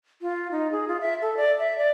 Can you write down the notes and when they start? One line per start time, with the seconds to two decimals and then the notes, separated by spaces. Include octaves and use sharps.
0.22 F4
0.51 D#4
0.72 G#4
0.88 F4
1.01 E5
1.22 A4
1.37 D5
1.59 E5
1.78 D5